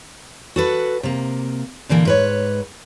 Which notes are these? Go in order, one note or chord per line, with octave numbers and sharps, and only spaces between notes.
F#4 A4 B4
C3 A#3
A#2 D3 E3 A#3
G#2 B4 C#5